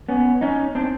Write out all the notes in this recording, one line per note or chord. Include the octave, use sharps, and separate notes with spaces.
B3 C#4
C#4 D#4
C4 D4